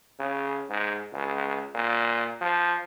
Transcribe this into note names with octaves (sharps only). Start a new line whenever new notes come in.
C#3
G#2
C#2
A#2
F3